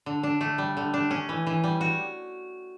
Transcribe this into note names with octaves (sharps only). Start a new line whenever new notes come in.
D3
D4
A3
G3
D3
D4
C#4
E3
E3
G3
F#4